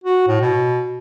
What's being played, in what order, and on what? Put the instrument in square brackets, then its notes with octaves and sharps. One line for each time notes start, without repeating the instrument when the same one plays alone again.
[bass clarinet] F#4
A2
B2